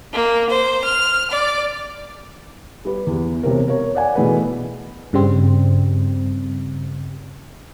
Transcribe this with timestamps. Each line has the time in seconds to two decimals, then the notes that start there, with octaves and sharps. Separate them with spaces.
0.11 A#3
0.48 C5
0.83 F6
1.30 D5
2.85 G3 B4
3.07 E2
3.43 E1 C3 A#4
3.68 A#4 C#5
3.95 D5 F#5 G#5
4.15 B2 E3 A3 G#4 B4
5.13 G2 C#3 G3 C4